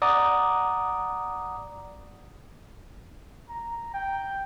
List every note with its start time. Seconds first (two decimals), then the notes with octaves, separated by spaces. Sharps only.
0.02 D5 F#5 A#5 D6 D#6
3.49 A#5
3.94 G5